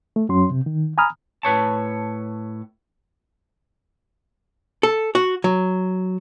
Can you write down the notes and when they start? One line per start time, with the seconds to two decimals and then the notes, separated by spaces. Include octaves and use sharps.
0.16 A3
0.29 F#2 F#3 C#4 C6
0.50 C3
0.66 D#3
0.98 G#5 A#5 B5 D#6 F6
1.43 A2 B4 C#5 A5
4.83 A4
5.15 F#4
5.44 F#3